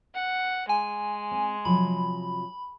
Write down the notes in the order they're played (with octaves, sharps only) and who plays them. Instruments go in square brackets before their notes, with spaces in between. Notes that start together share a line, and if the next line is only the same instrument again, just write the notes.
[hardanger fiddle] F#5
[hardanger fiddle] G#3 [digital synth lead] G#5
[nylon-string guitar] C4
[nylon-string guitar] C3 F3 F#3 [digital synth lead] B5